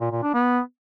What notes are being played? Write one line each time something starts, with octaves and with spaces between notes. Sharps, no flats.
A#2
A#2
D4
B3